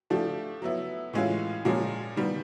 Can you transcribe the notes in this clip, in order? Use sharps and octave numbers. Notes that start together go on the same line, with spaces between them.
F3 A3 D4 G4
F#3 B3 E4
A2 E3 G#3 C#4 F4
A#2 F3 G#3 C#4
D#3 G3 B3